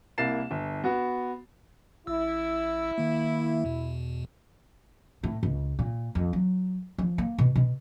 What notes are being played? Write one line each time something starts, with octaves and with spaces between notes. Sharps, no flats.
C2 A#3 E4 A6 C7 E7
G1
B3 F#4
A1 E4 E6
D#3 A#3
E2 B2
A2
C#2
A#2
F2
F#3
F3
A#3
B2
B2